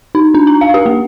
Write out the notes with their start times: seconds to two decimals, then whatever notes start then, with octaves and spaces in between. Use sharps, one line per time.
0.15 D#4
0.34 D4
0.47 A#5
0.61 F5
0.74 G4
0.86 A#3